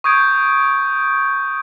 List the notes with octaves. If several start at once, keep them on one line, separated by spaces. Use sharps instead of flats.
C#6 D#6 G6 G#6 D7